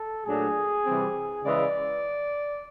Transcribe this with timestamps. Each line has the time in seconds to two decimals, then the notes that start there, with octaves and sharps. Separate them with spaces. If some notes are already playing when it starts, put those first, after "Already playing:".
Already playing: A4
0.25 A#2 F#3 A3 D4 G#4
0.85 C3 E3 G3 C4
1.44 C#3 E3 G#3 D5